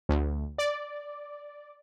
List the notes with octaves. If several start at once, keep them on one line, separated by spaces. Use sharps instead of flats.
D2
D5